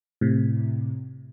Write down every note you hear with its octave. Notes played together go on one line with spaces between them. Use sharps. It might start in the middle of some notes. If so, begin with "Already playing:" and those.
A2 C3